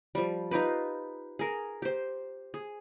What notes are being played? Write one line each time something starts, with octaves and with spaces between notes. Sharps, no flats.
F3 G3
D#4 F4 G4 B4
G#4 A#4
G4 C5
G#4